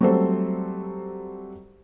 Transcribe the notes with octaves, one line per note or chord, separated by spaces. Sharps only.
F#3 G3 A3 C4 A4 C5